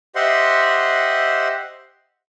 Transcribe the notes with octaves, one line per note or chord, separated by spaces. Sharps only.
G4 C5 D#5 E5 F#5 C6